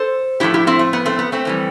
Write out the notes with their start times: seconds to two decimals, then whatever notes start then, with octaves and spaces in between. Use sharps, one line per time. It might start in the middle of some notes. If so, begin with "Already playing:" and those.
Already playing: A4 C5
0.40 A2 F3 A3 E4 G4
0.54 E4 G4
0.67 C4 E4
0.79 A3
0.93 B3
1.06 A3 C4
1.19 B3
1.32 A3 C4
1.45 F2 E3 G3